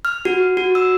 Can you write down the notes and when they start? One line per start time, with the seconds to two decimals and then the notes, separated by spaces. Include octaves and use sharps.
0.05 F6
0.25 F#4
0.57 F#4
0.75 E6